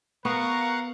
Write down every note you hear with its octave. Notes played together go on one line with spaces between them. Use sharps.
B3 A#4 F5 F#5 C#6 F#6